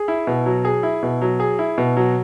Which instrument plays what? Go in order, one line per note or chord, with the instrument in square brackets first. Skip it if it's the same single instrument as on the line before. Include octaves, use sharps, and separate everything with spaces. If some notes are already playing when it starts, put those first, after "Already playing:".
Already playing: [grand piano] G#4
E4
B2
F#3
G#4
E4
B2
F#3
G#4
E4
B2
F#3